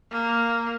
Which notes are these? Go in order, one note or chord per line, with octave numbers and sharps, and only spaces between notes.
A#3